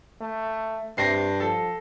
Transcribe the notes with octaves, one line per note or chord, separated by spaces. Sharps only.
A3
G2 C3 A#6 C7
F3 A4